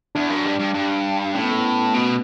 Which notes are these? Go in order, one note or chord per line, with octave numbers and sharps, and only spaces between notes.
E2 D4
F#2
G2
G2
G2
A2 C#4
B3
A3
B3
B2